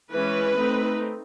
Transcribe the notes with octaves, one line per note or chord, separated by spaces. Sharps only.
E3 G#3 C#4 B4
A3 C4 D#4